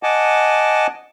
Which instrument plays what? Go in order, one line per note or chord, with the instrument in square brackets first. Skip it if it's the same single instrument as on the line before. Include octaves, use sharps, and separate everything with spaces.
[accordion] D#5 F#5 G#5 A5 D6